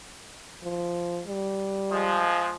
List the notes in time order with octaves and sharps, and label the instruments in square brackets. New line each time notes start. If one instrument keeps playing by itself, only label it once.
[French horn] F3
G3
[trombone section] F3 G#3